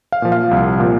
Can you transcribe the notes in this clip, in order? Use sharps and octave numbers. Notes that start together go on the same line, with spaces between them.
F5
A#2 F3
F5
C2
A#2 F3